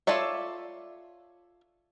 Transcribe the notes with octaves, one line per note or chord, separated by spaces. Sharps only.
F4 A4 C#5 D5 E5